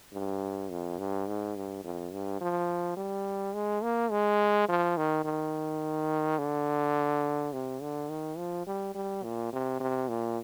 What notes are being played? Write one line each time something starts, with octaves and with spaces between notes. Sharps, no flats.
G2
F2
G2
G#2
G2
F2
G2
F3
G3
G#3
A#3
G#3
F3
D#3
D#3
D3
C3
D3
D#3
F3
G3
G3
A#2
C3
C3
A#2